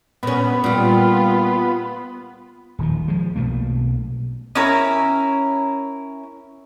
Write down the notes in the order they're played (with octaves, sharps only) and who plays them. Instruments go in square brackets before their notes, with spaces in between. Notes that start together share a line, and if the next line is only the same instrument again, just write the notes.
[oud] A#2 C#4 [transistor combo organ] B3
[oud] A#2 G3 [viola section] F4
[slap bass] D#1 D#3 F3
F3 G#3
B1 B2 A3 A#3
[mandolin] C#4 E4 A#4